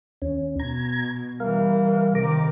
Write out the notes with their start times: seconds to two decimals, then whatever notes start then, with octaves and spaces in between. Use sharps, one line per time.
0.22 D#2 C#4
0.60 B2 A#5 G#6
1.40 E3 G3 A#4 F5
2.15 C3 D#3 A#4 A#5 D6